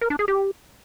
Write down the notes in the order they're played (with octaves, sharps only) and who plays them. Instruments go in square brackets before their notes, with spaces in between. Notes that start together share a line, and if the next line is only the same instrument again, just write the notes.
[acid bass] A#4
D4
G#4
G4